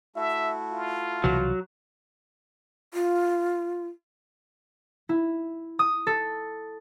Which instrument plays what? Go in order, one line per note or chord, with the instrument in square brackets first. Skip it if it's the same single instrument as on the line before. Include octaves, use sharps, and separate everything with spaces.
[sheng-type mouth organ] A3 E4 F#4 [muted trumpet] E5
[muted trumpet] F4
[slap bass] C2 B2 E3 [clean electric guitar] F#3
[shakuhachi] F4
[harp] E4
D#6
A4